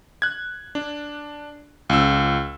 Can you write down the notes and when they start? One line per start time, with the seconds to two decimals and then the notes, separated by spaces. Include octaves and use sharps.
0.22 F#6 G#6
0.75 D4
1.90 C#2 E6